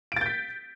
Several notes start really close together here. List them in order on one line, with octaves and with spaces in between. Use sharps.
D7 A6 G6 B6